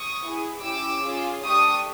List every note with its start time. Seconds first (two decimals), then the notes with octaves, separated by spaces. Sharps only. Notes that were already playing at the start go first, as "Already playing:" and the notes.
Already playing: C#6 D#6
0.19 B3 E4 G#4
0.60 C#4 E4 G4 D6 E6
1.03 C#4 F4 G#4
1.44 A3 D4 G4 C#6 D#6